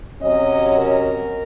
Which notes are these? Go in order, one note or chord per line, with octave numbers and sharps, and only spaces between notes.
C3 F#3 C#4 D#5
A#4